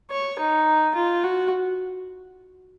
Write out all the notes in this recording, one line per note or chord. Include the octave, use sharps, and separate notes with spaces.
C#5
D#4
F4
F#4